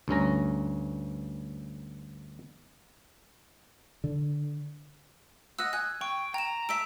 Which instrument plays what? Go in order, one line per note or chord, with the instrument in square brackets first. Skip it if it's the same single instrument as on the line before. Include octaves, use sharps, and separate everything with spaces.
[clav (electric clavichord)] D2 G2 C#4 A#5
[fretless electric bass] D3
[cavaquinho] D#5 F#5 [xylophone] E6
[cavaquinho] G#5 [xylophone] F#6
[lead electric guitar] G5 [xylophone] C#6
[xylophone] G5 E7 [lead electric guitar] A#5
[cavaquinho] A4 E5 [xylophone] B6 D7